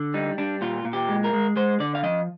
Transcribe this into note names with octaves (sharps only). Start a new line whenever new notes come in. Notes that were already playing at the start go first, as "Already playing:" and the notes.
Already playing: D3
G3 D#4
G3 D4
A#2 F4
A#2
G4
G#3
A#4
G#3
G#3 C5
D3 D5
F5
F3 D#5